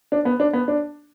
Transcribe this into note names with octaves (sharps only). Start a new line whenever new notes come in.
D4
B3
D4
B3
D4